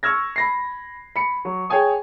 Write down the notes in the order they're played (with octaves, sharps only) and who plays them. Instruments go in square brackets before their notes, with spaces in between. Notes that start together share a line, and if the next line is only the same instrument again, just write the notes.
[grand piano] C#6 E6 F6 G#6 A#6
B5 A#6 C7
B5 C#7
F#3
G#4 C#5 G5 G#5 D#6